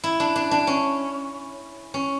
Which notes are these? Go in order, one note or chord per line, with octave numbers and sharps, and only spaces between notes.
E4
D4
D4
D4
C#4
C#4